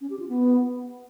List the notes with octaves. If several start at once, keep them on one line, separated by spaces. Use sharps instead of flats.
C#4
G4
F4
B3